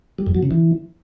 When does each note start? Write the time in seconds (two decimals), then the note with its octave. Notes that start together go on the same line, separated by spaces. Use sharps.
0.19 G3
0.27 F#2
0.35 F#3
0.43 C#3
0.51 E3